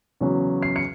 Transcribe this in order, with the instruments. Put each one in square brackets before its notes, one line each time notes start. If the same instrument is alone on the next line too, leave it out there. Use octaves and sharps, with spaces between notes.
[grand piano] E2 C#3 F#3 C#4
C7
C#7